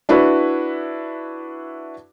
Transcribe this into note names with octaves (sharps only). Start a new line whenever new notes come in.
D4 E4 F#4 B4